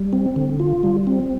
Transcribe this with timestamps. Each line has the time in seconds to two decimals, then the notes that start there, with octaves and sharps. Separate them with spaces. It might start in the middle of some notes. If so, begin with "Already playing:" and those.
Already playing: G3
0.13 C4
0.36 D3
0.60 F4
0.83 G3
1.07 C4